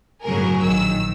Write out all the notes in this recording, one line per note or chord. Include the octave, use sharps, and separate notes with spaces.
G1 A2 C#3 F#3 G#4 A#4
A#1 D#3 E6